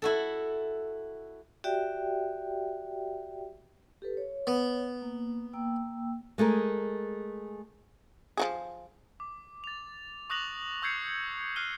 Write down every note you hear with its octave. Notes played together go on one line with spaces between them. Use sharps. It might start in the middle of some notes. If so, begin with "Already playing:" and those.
E4 F#4 A4
F#4 G4 D5 E5 G5
G4 A4 B4
C#5
B3
A#3
A#3 G5 E6
G#3 A3 G#4 A#4
F3 F#4 G#4
D6
A6 F7
C#6 D#6 F#6 A#6 F7 F#7
C#6 E6 G6 G#6 C7 C#7
F6 F#6 C7 D#7 G7